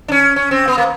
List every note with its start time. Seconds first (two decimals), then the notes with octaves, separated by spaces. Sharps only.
0.08 D4
0.12 C#4
0.36 C#4
0.51 C4
0.68 B3
0.78 A#3